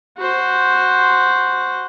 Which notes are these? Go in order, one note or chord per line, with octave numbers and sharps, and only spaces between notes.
F#4 C5